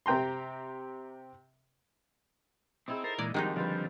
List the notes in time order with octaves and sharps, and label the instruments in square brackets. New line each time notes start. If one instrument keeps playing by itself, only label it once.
[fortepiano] C3 C4 G5 A#5 C6
[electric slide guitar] C4 [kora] D#4 E4 G#4
[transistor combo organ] A4 C5 [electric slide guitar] A#4
[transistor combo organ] A#2 E3 G#3 [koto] D5
[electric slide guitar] F2 [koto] D#3 G#3 D#4 [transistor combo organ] G3 [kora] F#4 G4
[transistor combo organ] D3 F3 G3 [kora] D4 F4 B4